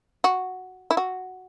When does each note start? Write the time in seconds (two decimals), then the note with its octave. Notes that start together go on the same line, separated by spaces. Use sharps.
0.24 F#4
0.91 E4
0.97 F#4